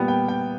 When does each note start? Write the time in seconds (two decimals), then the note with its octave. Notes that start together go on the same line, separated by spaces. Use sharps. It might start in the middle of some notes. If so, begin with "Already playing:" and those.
Already playing: A#2 G3 B3
0.08 G5
0.28 G5